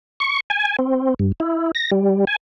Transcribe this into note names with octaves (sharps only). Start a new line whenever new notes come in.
C#6
G#5
C4
G2
E4
A#6
G3
G#5